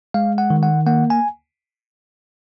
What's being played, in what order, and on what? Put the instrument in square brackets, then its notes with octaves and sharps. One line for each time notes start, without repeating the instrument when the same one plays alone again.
[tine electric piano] G#3 F5
F#5
D#3
F#5
A#3 F#5
G#5